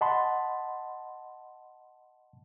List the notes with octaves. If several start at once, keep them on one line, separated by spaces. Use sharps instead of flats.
D#5 F#5 A5 B5 C6